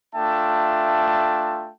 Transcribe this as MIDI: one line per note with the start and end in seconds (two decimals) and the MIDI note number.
0.16 1.70 57
0.16 1.70 62
0.16 1.70 65
0.16 1.70 76
0.16 1.70 79
0.16 1.70 81